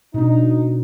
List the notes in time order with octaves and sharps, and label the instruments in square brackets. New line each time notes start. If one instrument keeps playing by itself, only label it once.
[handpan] B2 D4 [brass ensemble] D#4